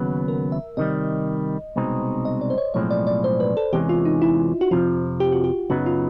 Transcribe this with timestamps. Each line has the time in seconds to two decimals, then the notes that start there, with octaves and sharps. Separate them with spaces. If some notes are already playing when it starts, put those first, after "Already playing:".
Already playing: D#2 C#3 F#3 B3
0.28 A#4
0.52 E5
0.77 C3 D#3 G3 D#5
1.76 C2 B2 G#3 C4 D#4
2.25 D#5
2.41 D5
2.50 C5
2.58 C#5
2.74 B1 A2 F3 G#3 C4 C#5
2.91 D5
3.07 D5
3.24 C5
3.40 B4
3.57 A4
3.73 E2 C3 E3 G#3 C#4 G4
3.89 F4
4.05 D#4
4.22 E4
4.61 F#4
4.71 F2 C3 F3 F4
5.20 G4
5.32 F#4
5.44 G4
5.70 F#2 C#3 F#3 B3 D#4 F#4
5.86 F4